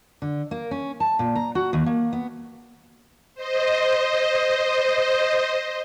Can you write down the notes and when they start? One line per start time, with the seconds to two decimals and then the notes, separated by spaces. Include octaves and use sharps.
0.22 D3
0.51 A#3
0.71 C#4
1.00 A5
1.19 A#2
1.35 A#5
1.55 F#4
1.73 D#2
1.86 A#3
2.13 B3
3.35 C5 D#5